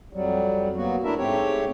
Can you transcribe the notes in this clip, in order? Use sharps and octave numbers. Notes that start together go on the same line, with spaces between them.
F2 F#3 G3
F#3 A#3 B3 F#4
A3 D4 E4 A#4 E5
G#2 A3 C4 G4 C#5